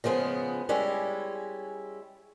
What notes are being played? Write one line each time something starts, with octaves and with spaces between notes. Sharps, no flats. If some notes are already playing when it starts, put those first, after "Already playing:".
C#3 F3 G#3 B3
G3 G#3 C#4 E4